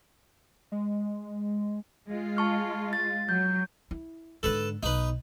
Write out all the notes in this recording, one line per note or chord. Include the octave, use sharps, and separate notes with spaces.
G#3
G#3 F4
A5 C#6 F6
A6
F#3 G6
E4
G#2 D3 A4 B4
B1 D#4 B4